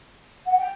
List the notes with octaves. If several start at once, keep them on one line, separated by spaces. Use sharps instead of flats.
F#5
G5